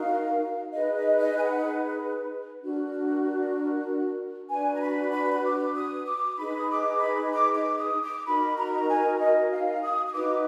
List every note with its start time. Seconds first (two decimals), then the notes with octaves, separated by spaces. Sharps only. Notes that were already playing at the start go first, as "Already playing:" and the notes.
Already playing: D#4 F#4 A#4 F5
0.73 D#4 G#4 B4 D#5
0.96 D#5
1.20 D#5
1.38 G#5
1.44 F#5
2.61 D4 F#4 A#4
4.49 D4 F#4 B4 G#5
4.76 A#5
4.81 B5
5.12 B5
5.33 B5
5.44 D6
5.75 D#6
6.06 D6
6.37 D#4 G#4 B4 B5
6.57 D#6
6.69 D6
7.01 B5
7.32 D6
7.55 D6
7.78 D#6
8.03 D6
8.25 D#4 F#4 A#4 B5
8.56 A#5
8.89 G#5
9.19 D#5
9.52 F5
9.82 D#6
10.07 D#6
10.13 D#4 F#4 B4 D6